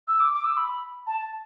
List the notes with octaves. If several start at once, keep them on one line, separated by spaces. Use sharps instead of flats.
E6
D6
D6
E6
B5
A5